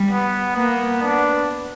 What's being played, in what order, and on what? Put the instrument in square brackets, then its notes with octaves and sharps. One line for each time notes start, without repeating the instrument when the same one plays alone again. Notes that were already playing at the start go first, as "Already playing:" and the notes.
Already playing: [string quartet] G3
[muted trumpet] B3
[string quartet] A#3 [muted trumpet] B3
[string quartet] B3 [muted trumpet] D4